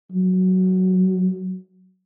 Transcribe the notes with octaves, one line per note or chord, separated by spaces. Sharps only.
F#3